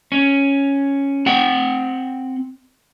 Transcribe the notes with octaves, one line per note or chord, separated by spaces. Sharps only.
C#4
C4 F#5 G5